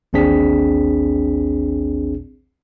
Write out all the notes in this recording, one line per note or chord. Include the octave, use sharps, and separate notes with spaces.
A1 D#2 C4 D4 G#4 B6